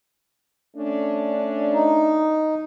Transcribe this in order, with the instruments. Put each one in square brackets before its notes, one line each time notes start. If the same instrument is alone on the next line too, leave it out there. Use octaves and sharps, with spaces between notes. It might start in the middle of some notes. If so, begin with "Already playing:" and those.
[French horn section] A3 C#4 D4
[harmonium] D#4